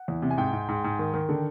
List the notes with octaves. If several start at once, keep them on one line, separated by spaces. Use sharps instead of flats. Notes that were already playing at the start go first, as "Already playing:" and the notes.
Already playing: F#5
E2
C3
G#5
G#2 G5
G#2
G#2
G#2
D#3
D#3
D3